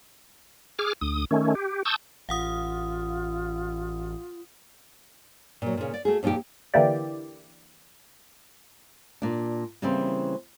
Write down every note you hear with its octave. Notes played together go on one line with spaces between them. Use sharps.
G#4 D6 F6
D2 D#6
D#3 A3 C#4
G4
A5 C#6 D#6 E6 G6
A1 F4 F5 F#5 D#6
A#2 F#3
A#2 C#3
D5
A3 F#4 G#4
F2 A#2 D4 D#4 G4
D3 E3 A#3 E4 G4 D5
A#2 D4
C#3 E3 G3 A#3 C4